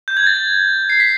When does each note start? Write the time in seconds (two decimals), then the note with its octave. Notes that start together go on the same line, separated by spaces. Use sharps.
0.08 G6
0.17 G#6
0.27 A6
0.90 C7
1.00 B6